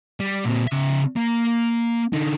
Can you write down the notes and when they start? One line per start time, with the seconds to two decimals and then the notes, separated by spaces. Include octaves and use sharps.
0.20 G3
0.46 A#2 C4
0.67 C#3 E5
1.16 A#3
2.13 D3 D#4